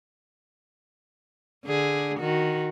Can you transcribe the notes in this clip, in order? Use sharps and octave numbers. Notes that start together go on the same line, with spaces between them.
D3 G#4
D#3 F#4